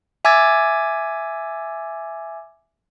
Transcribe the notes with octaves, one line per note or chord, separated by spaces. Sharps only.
E5 G#5 D6 E6 G#6 A6